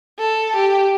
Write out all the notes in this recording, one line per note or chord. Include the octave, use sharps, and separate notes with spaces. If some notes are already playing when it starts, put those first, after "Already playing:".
A4
G4